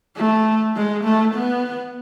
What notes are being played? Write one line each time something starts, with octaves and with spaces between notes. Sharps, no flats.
A3
G#3
A3
B3